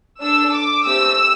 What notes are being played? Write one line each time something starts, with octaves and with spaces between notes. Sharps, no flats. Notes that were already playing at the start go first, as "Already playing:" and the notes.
D4 A4 E6
D6
A3 C4 G4 E6